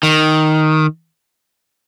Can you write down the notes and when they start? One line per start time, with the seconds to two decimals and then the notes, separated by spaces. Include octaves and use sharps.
0.03 D#3